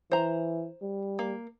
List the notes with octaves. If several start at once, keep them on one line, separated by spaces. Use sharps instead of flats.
E3 C5 A#5
G3
A#3